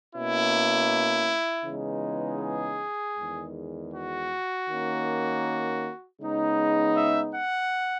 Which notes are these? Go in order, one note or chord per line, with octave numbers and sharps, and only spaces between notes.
B2 A#3 C#4 E4
C#3 E3 G#3 B3 D#4
G#4
E2 D#3 G#3
F#4
D#3 A#3 C#4
C#3 G#3 B3 D#4
E5
F#5